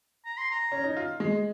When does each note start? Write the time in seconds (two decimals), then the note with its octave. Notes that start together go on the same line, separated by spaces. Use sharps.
0.25 A#5
0.37 C6
0.51 A#5
0.72 C#4
0.84 D#4
0.97 F4
1.20 G#3